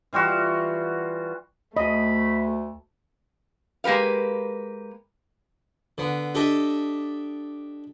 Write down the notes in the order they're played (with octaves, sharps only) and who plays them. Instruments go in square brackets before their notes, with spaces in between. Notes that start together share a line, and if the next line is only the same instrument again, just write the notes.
[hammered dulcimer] E3 G3 F4 F#4
[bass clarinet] D2 [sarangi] A3 [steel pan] D#5 [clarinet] B5
[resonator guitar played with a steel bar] G#3 A#3 G4 B4 F5
[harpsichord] D3 B3
D4 G4 A4 D#5 E5